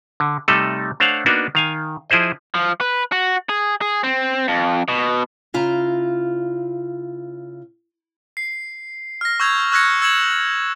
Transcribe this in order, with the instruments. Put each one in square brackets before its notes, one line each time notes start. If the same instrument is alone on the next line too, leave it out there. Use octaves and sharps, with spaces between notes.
[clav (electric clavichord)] D3
C3 G3 A3 D#4 A4
A3 D4 C5 C#5 F5 F#5
A#3 B3 D4 D#4 F#4
D#3 F5 G#5
F3 E4 G#4 C5 D#5
[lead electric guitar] F3
B4
F#4
G#4
G#4
C4
F2
B2
[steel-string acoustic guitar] C#3 E4 F4 A#5
[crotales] C7
F6 A#6
C#6 E6 G6 G#6 F7
C#6 E6 F#6 G#6 A#6 C#7
E6 G#6 C#7 E7 F#7